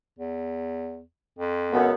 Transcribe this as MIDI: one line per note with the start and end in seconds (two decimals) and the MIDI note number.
0.19 1.03 40
1.38 1.83 41
1.72 1.92 37
1.72 1.92 42
1.72 1.92 59